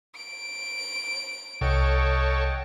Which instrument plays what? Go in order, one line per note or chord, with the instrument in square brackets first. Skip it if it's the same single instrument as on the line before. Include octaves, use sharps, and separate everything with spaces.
[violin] D7
[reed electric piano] C2 [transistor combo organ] A4 C#5 [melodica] D#5 F#5 G5